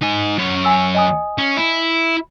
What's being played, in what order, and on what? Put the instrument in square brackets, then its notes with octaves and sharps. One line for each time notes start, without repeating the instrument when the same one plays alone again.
[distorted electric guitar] D#4 G#5
F#2 C#5
[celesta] G#5 E6
D#5 G#5 D#6
[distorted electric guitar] C#4
E4